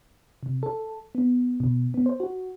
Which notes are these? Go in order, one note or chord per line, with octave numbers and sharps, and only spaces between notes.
C3
A4
B3
B2
B3
C5
F#4